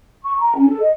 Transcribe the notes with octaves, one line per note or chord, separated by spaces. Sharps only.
C#6
A#5
C#4
A4
D#5